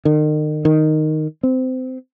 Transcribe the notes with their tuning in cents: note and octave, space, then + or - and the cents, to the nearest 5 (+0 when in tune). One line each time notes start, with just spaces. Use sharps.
D#3 -35
D#3 -5
C4 -25